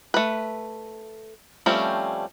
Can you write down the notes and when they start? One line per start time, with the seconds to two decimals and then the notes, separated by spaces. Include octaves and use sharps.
0.14 A3 B4
1.66 F3 G3 A3 C4 C#4